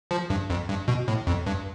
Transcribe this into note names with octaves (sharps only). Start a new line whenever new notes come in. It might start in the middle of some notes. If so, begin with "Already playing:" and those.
F3
G2
F2
G2
B2
A2
F2
G2